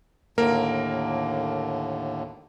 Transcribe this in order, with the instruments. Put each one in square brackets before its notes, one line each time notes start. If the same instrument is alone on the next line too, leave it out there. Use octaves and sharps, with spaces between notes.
[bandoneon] D#2 A2 D3 [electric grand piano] A#3 A#4